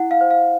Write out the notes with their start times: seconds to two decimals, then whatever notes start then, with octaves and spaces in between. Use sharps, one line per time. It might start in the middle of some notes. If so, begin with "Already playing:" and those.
Already playing: E4 F#5
0.11 F5
0.21 C5
0.31 F5